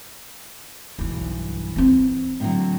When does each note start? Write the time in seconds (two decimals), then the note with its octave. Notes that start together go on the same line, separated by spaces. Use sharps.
0.99 B1 G2 E3
1.76 B3 C4
2.40 A2 D3 F#3